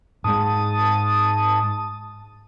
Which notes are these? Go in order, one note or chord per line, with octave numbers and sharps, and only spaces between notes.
G#2 G#3 A5 D#6